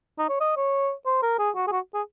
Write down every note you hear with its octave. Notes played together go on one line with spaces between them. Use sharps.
D#4
C#5
D#5
C#5
C5
A#4
G#4
F#4
G#4
F#4
G#4